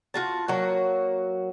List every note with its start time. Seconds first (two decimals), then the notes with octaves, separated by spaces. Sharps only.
0.14 F4 F#4 A5
0.48 F#3 A#3 F#4